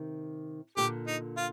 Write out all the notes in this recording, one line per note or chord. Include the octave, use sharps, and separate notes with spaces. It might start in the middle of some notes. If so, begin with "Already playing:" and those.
Already playing: C3 D#3
A#2 D3 G4
D#4
F4